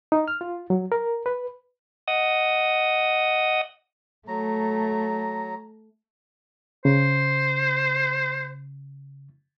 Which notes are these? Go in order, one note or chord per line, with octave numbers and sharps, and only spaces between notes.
D#4
F6
F4
F#3
A#4
B4
D#5 F#5 D#6
F#3 A3 A#5
C#3 C5